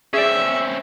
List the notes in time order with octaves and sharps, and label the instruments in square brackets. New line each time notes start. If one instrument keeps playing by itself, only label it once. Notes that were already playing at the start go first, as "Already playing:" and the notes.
[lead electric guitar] C4 C#4 [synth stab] G#4 D5 [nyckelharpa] E5